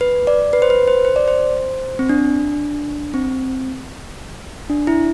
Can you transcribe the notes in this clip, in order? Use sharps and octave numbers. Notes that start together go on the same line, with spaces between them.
B4
D5
B4
C5
B4
C5
C5
D5
C5
C4
D4
C4
D4
E4